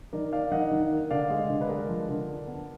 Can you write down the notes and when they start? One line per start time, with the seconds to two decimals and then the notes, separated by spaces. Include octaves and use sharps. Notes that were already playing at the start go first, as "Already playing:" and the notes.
0.13 D#3 A#4 D5
0.33 A#3 D5 F5
0.52 D#3 D#5 F#5
0.71 D#3
0.91 A#3
1.11 D3 D5 F5
1.30 G#3
1.50 D3
1.61 B4
1.69 G#3 A#4 D5
1.89 F3
2.09 D3
2.28 D4
2.47 B3